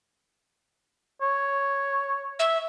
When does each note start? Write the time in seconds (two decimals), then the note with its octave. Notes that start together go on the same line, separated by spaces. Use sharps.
1.21 C#5
2.39 E5